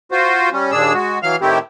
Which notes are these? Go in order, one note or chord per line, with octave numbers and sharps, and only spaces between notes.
F4 F#4 C5
G3 C#4
D#2 A#2 D4 G#4 E6
G#3 F#4
E3 F#3 F5 F6
A2 D#3 A3 C4 E4 G4